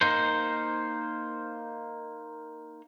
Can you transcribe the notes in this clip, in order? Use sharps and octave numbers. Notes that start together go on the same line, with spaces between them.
A#3 D#4 C5